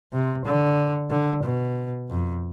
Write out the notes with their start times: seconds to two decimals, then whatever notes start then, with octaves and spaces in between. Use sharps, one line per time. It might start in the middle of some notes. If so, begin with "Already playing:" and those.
0.13 C3
0.45 D3
1.10 D3
1.43 B2
2.10 F2